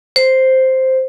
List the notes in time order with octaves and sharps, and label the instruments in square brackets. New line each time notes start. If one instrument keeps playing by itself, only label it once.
[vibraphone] C5